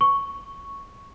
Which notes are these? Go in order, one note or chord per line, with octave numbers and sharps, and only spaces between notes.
C#6